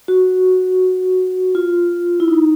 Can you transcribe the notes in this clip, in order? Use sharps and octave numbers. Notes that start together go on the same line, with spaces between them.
F#4
F4
E4
D#4